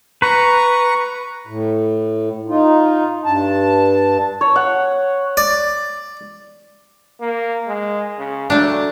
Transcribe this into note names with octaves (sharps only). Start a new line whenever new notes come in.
B4 A#5 C#6
A2
D#4 F4
G2 A5
C#5
F#5
D5
A#3
G#3
C#3
F#3 A3 D4